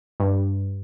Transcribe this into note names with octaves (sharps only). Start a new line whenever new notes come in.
G2